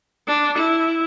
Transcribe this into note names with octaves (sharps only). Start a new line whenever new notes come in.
D4
E4